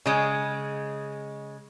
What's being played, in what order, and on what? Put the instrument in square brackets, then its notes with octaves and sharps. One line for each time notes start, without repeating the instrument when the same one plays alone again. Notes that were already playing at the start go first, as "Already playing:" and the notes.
[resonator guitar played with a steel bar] C#3 G#3